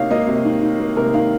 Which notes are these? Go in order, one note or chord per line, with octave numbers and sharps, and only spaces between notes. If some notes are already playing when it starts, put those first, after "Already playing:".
Already playing: C3 D#3 A#3 D#4 C#5 F5
A#3 D#5
C3
D#3
D#4
A#3
C3 A#4
D#3 F5